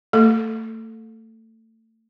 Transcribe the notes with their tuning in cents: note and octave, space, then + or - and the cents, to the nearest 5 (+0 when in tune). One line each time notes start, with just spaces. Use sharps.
A3 +30 A4 +0